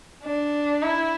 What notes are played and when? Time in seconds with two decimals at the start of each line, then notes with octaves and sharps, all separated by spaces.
0.24 D4
0.82 E4